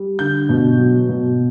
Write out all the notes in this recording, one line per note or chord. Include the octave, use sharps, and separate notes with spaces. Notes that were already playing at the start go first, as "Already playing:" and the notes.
Already playing: G3
D3 G6
B2
F#3
B2